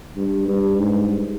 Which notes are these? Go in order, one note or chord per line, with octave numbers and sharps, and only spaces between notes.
G2
G2
G#2